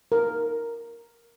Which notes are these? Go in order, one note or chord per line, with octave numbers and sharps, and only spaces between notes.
A#4